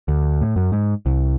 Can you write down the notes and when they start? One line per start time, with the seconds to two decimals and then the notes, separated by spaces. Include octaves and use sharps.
0.08 D2
0.41 A2
0.56 F#2
0.72 G#2
1.06 C2